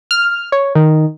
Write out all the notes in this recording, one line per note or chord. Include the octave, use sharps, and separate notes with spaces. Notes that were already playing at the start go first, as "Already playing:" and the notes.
F6
C#5
D#3